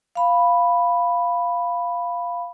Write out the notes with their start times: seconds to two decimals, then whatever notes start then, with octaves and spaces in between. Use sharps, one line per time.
0.15 F5 B5